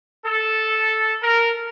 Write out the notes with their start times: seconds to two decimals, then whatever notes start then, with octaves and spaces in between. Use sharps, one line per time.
0.26 A4
1.23 A#4